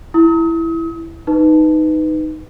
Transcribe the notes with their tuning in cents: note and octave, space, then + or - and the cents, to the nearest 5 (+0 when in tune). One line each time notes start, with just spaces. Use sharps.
E4 +5 D#6 +40
D#4 +0 B4 +10